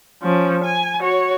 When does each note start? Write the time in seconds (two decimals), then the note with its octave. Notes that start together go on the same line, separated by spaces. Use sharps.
0.23 F3 C#4
0.64 G#5
1.00 F#4 C#5